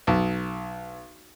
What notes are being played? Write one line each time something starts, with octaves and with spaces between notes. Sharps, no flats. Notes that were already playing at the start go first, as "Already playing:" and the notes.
B1